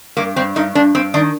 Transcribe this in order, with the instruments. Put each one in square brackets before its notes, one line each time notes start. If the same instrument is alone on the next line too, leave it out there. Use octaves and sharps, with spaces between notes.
[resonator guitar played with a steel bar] G2 A#3
G2 C4
G2 D#4
G2 D4
G2 C4
D#3 D4